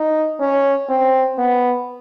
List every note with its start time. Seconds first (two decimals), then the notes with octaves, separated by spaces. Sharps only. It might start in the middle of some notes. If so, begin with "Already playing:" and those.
Already playing: D#4
0.40 C#4
0.89 C4
1.38 B3